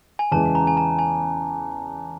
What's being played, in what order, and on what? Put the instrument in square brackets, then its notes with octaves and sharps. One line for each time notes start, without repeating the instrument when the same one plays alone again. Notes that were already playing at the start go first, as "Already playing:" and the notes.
[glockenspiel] G#5
[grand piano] E2 C#3 E3 G#3 [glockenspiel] A5
[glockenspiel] A#5
G#5
A5
G#5